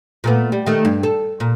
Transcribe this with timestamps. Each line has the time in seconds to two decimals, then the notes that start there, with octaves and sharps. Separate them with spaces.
0.24 A#2 A3 B3
0.52 G3
0.66 D#3 A3
0.85 G2
1.03 A4
1.40 A#2